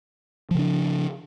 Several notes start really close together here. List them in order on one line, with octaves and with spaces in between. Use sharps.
F3 C#3 D4